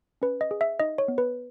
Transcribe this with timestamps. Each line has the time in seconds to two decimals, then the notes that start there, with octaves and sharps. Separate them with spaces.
0.22 C#4 B4
0.41 D#5
0.51 G#4
0.61 E5
0.80 D#4 D#5
0.98 C#5
1.08 B3
1.18 B4